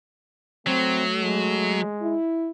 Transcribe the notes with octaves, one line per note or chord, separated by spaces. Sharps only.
F#3 A3 C4
G#3
E4